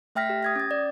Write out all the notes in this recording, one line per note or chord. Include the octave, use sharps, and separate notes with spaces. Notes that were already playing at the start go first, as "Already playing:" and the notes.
A3 E5 G5 F6 A#6 B6
G4
D#6 G#6 A#6
C#4 A6
D5